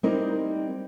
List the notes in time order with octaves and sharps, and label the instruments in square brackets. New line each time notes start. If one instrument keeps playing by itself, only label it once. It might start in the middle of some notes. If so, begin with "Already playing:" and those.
[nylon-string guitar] G3 C4 D#4 E4 A#4